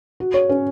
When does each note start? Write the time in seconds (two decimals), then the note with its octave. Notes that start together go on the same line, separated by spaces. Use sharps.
0.20 F#4
0.34 C#5
0.49 C#4